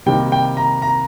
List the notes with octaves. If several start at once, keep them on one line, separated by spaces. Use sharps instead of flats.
C3 D#3 G3 A#3 G5
G5
A#5
A#5